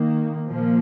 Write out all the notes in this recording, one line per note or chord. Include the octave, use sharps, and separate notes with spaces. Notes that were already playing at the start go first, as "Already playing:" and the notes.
Already playing: D#3 A#3
A#2 F3 A#3